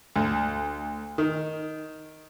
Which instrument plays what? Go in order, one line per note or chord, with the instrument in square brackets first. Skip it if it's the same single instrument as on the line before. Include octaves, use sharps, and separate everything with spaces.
[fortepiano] D2
D#3